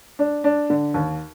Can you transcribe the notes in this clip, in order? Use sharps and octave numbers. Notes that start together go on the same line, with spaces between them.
D4
D4
D3
D#2